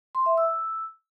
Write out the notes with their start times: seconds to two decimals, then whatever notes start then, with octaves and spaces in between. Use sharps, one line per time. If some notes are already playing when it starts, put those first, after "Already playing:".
0.15 C6
0.26 E5
0.38 E6